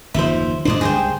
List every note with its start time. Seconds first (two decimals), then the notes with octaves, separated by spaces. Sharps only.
0.14 F#1 D#2 F3 C5 E5
0.65 D2 G2 D4 C5 D5 D#5
0.81 C#2 G2 G#4 C5 G5